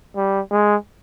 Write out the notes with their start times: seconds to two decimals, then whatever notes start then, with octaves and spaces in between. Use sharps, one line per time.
0.16 G3
0.51 G#3